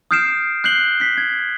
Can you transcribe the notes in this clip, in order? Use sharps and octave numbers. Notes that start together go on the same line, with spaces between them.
D#6 F6 G6 C7 D7 E7
F#6 G6 C7 F#7 G7
B6 C7
G#6